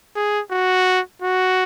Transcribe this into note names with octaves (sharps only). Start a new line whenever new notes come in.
G#4
F#4
F#4